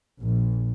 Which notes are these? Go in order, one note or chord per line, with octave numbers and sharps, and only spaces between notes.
A#1